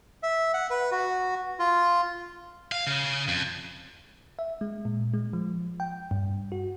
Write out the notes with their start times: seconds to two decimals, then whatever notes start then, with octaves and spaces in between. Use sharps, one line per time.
0.23 E5
0.54 F#5
0.70 B4
0.92 F#4
1.59 F4
2.72 F5
2.87 C#3
3.28 F2
4.39 E5
4.61 G#3
4.85 A#2
5.14 G#3
5.33 F3
5.80 G5
6.11 G2
6.52 F#4